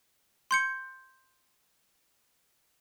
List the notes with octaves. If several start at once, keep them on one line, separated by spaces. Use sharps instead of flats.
C6 G6 C#7